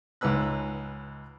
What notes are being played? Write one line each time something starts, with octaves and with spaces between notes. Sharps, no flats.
C#2 G#2 B4 E6 F#6